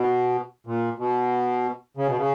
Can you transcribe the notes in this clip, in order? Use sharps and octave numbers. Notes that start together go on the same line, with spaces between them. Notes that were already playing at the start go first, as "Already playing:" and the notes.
Already playing: B2
A#2
B2
C#3
B2
C#3